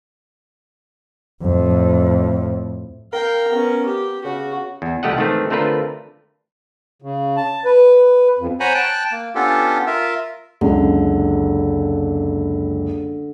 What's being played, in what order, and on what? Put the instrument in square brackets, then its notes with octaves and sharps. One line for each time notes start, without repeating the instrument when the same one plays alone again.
[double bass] F2 A2
[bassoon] A#4 [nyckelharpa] F5 G5
[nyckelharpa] B3 C#4
G4
[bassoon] C#3 [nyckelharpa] F#4
[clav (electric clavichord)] E2
C2 F3 A3 G4 D#5 F#5
G#2 D#3 E3 A3 C4
D3 A3 C4 F4 A#4 B4
[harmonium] C#3
A5
B4
F2
[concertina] C5 C#5 F#5 G#5 A#5 B5
G5 A5 F#6
A#3
B3 C#4 D4 F4 G4 A4
F4 A#4 E5
[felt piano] F#1 C#2 [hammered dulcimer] D3